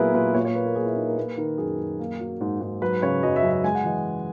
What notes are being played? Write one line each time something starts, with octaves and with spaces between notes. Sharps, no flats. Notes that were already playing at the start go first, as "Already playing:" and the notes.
Already playing: A#2 F#3 B3 E4 G#4 A#4 B4
A#2 B4
A#2 C#5
C#5
A#3 B4
A#4
A#2 G#4
E4
A#3 D#4
A#4
A#3 B4
D#3 A#4
F#2 G#4
F#2
A#3
F#3
G#2
G#2
F#3 B4
C#3 C#5
F#2 D#5
E5
F#2
E5
G#3 G#5
F#5
E3 D#5